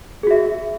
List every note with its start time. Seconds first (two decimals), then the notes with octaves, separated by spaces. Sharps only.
0.23 G#4
0.27 F#4
0.31 E5